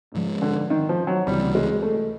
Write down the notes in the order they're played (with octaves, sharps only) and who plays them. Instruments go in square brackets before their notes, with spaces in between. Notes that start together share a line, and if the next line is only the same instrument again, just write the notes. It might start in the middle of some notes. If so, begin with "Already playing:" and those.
[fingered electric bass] G#2 F3 G#3
[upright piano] D3
D#3
F3
F#3
[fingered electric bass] C#2 C3 E3 [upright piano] G3
[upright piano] G#3
A3